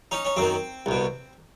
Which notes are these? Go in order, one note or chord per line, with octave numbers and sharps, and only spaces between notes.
C#4 D#4
C#4
F#2 D#3 C4
C2 B2